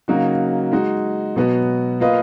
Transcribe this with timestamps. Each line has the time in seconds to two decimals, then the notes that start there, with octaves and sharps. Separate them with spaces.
0.08 C#3 F#3 A#3 D#4 F#4
0.72 G#3 D#4 F#4
1.36 B2 F#3 B3 F#4
2.00 A#3 F4 B4 D#5